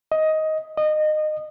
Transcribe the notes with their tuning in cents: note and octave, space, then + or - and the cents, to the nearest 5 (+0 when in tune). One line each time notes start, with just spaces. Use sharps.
D#5 +15
D#5 -20